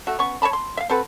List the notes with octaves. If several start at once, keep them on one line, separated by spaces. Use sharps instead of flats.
A3 F#4
B3 C#4 C#6
C#5 D#5 A5 B5
C6
E5 F5
C4 F#4 A4 B4